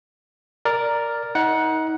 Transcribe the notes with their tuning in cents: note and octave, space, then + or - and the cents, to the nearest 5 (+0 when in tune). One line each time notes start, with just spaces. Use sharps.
A#4 +0 D5 +0
D#4 +30 F#5 +0